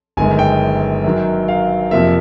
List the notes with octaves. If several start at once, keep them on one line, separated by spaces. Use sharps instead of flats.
G1 F#2 D#3 G#3 G#5
G5
F#2 D#3 F#3
F5
F2 C3 F3 A#3 E5